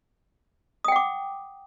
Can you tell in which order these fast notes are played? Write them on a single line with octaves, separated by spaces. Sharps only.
D#6 G5 F#5 D6